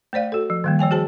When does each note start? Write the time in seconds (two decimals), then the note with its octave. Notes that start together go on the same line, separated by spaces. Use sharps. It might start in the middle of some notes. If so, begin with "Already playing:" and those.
0.13 A3 C5 D5 F5
0.32 F#4 A4
0.50 F3
0.64 D#3 G3 A#3
0.79 F3 C#5 G5 G#5
0.91 F#4 G#4 C5 A5